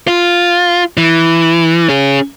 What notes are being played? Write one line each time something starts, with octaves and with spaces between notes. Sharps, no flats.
F4
E3
C#4 G#4